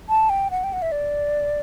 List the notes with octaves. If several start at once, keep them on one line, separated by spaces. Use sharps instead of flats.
A5
G5
F#5
G5
F#5
E5
D5